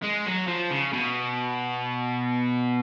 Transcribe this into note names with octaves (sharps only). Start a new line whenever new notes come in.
G#3
F#3
F3
C#3
B2